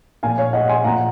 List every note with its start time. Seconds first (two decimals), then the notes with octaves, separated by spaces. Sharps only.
0.23 A#2 F3 F5 G#5
0.38 C#5 F5
0.53 D#5 F#5
0.69 G#5 C6
0.84 A#2 F3 F#5 A#5